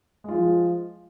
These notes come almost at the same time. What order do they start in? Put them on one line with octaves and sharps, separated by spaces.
G#3 F4 F3